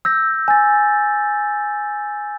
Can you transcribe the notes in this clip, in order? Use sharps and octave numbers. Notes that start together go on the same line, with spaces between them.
E6 G6 A#6
G#5 A6